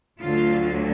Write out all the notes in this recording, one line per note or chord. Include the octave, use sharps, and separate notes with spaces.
D2 D3 F#3 F4